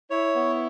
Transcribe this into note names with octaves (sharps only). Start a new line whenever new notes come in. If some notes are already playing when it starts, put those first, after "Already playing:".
E4 C#5
B3